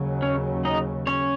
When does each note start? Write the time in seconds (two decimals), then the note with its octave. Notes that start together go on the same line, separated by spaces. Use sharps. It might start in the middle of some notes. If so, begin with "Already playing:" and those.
Already playing: D#2 C#3 F#3
0.22 C#4 C#5
0.65 D#4 D#5
1.07 C#4 C#5